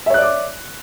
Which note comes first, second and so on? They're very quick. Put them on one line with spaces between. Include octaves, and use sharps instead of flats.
E5 C#5 F#6 D5 D6